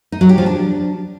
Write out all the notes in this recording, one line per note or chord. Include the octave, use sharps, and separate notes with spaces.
D#4
F#3
G4
F3
D4